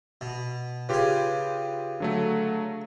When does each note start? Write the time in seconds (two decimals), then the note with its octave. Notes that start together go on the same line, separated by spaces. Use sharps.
0.21 B2
0.89 C#3 F4 G4 G#4 B4
2.00 D3 F#3 A3